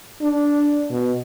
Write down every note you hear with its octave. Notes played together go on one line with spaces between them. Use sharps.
D4
B2